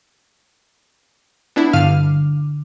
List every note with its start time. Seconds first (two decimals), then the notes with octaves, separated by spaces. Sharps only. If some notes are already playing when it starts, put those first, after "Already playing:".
1.56 B3 D4 E4
1.73 G2 D3 F5 F6